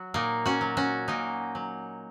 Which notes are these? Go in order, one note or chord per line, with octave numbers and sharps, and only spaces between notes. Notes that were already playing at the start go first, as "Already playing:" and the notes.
Already playing: F#3 F#4
A#2 A#3 D#4
C#4 F#4
F#3
C#4 F#4
A#2 A#3 D#4
F#3